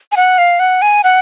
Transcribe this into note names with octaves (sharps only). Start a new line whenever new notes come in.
G#5
F#5
F5
F#5
G#5
F#5